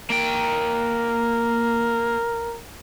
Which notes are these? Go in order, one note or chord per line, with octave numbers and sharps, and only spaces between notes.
A#3 A#4 G5